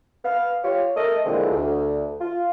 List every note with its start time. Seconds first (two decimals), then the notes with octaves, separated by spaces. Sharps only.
0.24 B3 F5
0.64 F4 G4 C#5
0.96 A3 A4 A#4 D#5
1.25 A#2 D3 E3 F3 G#3 C4
1.51 D2
2.21 F4